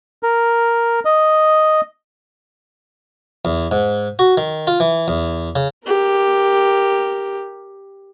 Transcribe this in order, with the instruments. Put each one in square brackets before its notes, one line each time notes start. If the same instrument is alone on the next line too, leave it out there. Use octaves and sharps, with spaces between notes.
[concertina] A#4
D#5
[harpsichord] E2
G#2
F#4
D#3
F4
E3
E2
C#3
[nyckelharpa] G4 A#4